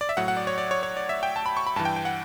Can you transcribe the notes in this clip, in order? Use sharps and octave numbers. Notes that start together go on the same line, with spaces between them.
D5
E5
A2 F#3 F#5
F#5
D5
C#5
D5
C#5
C#5
D5
E5
G5
A5
B5
C#6
B5
G2 E3 A5
G5
G5
F#5